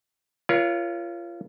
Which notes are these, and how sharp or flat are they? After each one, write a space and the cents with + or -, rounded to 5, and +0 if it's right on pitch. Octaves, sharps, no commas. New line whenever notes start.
F4 -25 A#4 +45 C#5 +15